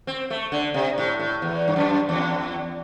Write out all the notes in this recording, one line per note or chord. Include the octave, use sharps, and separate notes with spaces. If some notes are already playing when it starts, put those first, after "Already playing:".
C4
A3
D3
C3
A2
A2
E2
G2
F#2
E2